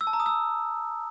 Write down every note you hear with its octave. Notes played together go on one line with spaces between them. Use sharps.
E6
A5
A#5
D#6
E6